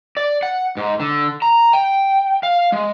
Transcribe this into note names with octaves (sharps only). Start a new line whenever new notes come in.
D5
F#5
G#2
D3
A#5
G5
F5
G#3